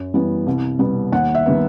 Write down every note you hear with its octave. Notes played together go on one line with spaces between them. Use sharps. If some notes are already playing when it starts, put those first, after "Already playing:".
Already playing: F#2
E3 G3 B3
C2
B2 G3 B3
D#2 F#5
E5
D#3 G3 B3